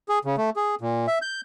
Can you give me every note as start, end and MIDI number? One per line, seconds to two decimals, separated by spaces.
0.09 0.19 68
0.25 0.36 49
0.38 0.50 57
0.56 0.75 68
0.81 1.06 46
1.07 1.19 76
1.22 1.41 91